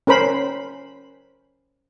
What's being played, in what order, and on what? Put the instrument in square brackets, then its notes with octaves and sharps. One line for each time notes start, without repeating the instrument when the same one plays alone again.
[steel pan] C#4 A#4 C5 B5